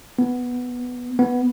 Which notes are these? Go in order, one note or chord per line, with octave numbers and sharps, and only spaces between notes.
B3
B3